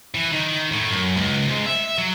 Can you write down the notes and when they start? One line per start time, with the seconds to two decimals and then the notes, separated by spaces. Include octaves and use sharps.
0.15 E3
0.32 D#3
0.72 A2
0.91 F#2
1.17 C#2
1.48 G#2
1.66 E5
1.98 F#3